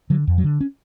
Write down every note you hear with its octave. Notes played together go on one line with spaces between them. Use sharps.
D3 F#3
F2
F#3
D3
C#4